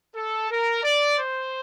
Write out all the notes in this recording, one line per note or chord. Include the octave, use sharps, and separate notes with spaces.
A4
A#4
D5
C5